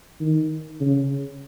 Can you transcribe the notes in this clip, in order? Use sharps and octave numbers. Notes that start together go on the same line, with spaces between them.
D#3
C#3